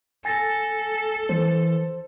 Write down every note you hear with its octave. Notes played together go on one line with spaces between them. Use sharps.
A4 G#5 A6 A#6
E3 C5